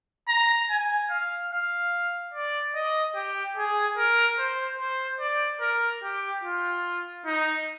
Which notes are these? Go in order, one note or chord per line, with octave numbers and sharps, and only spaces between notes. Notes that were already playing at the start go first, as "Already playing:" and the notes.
A#5
G#5
F5
F5
D5
D#5
G4
G#4
A#4
C5
C5
D5
A#4
G4
F4
D#4